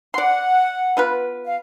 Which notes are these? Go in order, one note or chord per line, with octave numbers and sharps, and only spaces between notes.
D5 F#5 C6
B3 F4 B4
F5